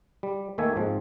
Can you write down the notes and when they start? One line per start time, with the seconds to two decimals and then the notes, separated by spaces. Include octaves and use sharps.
0.23 G3
0.58 D#2 D#3 A3 A#3 E5 G#5
0.76 G#2 F3 C4